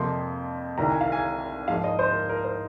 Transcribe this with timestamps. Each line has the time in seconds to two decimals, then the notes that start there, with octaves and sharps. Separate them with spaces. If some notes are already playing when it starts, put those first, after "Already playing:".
Already playing: F2 C3 F3 A#3 C6
0.78 C2 C3 D#3 A#5
0.89 G#5
1.01 F5
1.12 G#5
1.68 G#2 F3 A#3 F5
1.84 D#5
1.99 C5
2.13 A#4
2.29 A#4
2.44 C5